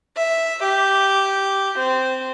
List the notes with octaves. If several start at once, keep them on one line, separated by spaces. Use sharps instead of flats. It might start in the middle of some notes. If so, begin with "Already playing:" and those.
E5
G4
C4